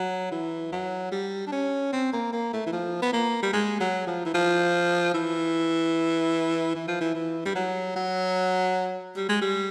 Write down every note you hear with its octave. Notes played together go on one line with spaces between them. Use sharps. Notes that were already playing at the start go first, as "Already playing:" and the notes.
Already playing: F#3
E3
F#3
G3
D4
C#4
C4
A#3
A#3
A3
E3
F3
B3
A#3
G3
G#3
F#3
F3
E3
F3
E3
E3
F3
E3
E3
G3
F#3
F#3
G3
G#3
G3